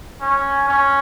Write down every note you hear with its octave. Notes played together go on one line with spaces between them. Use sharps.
C#4
C#4